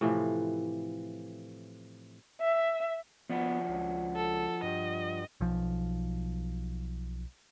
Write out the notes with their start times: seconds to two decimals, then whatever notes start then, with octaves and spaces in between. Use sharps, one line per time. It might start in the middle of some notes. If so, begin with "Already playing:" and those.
0.01 A2 C3 E3 F3
2.40 E5
3.30 F3 B3 D4 F#4
3.69 C#2
4.16 A4
4.63 G2 D#5
5.41 B1 F3